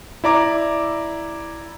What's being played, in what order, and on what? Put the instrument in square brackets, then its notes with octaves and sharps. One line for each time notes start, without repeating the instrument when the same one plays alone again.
[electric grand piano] E4 D5 A#5 D6